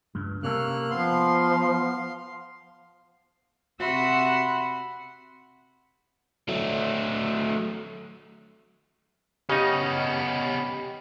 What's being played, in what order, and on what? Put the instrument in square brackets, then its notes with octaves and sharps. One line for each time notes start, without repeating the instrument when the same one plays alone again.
[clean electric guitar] C#2 G2
[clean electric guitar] C3 C#4 A4 [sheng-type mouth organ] A#3 F6 F#6
[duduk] F3 [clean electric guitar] B3 [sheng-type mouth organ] F5 C6
[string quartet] C3 F#4 E5 F#5 B5 C6
[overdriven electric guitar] F#3 A3
[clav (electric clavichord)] C#3 D#4 [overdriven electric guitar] B3 C#4 [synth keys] G4 D#5